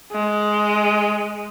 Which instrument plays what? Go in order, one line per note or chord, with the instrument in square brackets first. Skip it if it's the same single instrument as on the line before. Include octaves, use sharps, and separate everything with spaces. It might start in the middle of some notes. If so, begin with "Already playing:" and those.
[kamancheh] G#3